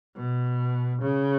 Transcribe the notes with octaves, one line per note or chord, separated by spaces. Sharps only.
B2
C#3